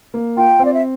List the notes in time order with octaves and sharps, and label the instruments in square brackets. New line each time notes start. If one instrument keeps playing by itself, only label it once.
[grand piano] A#3
[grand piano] F4 [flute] G5
[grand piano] C4
[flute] D5
E5